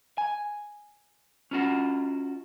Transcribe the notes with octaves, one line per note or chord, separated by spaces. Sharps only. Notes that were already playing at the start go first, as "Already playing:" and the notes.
G#5
C#4 F4 F#4